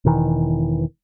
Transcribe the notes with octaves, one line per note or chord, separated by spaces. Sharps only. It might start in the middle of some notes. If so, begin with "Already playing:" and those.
E1 B2 D#3 E3